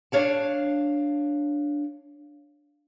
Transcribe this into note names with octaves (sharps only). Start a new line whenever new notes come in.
D4 C#5 F5 A5